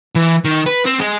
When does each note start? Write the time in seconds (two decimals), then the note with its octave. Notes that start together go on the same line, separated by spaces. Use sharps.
0.15 E3
0.44 D#3
0.66 B4
0.85 C4
0.99 G#3